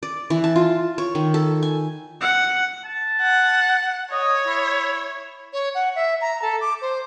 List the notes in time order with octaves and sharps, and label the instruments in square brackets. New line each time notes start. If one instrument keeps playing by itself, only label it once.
[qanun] D5
E3
A5
F4
C#5
D#3
A4
G#5
[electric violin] F#5
[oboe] A5
[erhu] F#5
[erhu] C#5 [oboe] D#5
[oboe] E4
[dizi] C#5
F#5
E5
A#5
A4
D6
C5